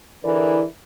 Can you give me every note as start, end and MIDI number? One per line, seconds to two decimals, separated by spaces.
0.24 0.63 50
0.24 0.63 52
0.24 0.63 64
0.24 0.63 68
0.24 0.63 70
0.24 0.63 74